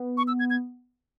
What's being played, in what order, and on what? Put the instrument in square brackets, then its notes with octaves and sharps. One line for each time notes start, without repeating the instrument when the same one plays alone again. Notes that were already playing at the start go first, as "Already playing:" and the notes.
Already playing: [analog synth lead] B3
[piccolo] C#6
E6
G#6
G#6